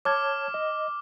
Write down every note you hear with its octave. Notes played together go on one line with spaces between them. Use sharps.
C#5 A5 D6 F6 G#6
D#5